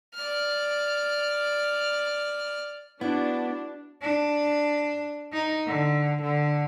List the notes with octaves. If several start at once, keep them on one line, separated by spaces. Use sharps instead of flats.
D5 F6
B3 D4 E4 F#4
D4
D#4
D3
D3